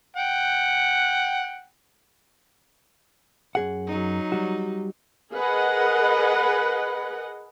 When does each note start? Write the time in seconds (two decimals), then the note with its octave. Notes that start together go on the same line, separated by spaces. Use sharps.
0.16 F#5 G5
3.55 F#2 G#4 F#5
3.87 F#3 D#4
4.32 G3 F#4
5.34 G#4 A#4 B4 D#5 F#5